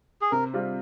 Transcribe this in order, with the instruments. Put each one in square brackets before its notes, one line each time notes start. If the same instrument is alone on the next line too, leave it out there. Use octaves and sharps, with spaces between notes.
[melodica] G#4
[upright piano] C3 [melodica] A#4
[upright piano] G3 C4 F4